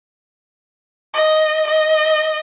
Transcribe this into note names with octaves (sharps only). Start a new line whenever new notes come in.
D#5
D#5